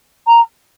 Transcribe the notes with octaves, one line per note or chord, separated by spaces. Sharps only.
A#5